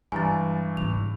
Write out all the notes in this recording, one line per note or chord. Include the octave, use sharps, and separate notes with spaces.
G2 E3 G#3 G#5 A#5 A6
G#2 C#3 F7